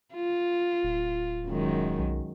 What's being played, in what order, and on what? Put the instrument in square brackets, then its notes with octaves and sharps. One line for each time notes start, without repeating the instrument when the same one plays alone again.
[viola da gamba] F4
[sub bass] D1
[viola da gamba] F#2 D#3 G#3
[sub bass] B1